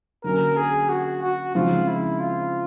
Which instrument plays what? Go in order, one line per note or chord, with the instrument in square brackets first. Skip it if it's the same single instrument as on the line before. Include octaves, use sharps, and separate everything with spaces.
[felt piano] D3 F#3 A#3 C#4 [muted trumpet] A#4
[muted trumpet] G#4
F#4
F#4
[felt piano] C#3 F3 G#3 C4 D#4 [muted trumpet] F4
[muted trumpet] E4
F4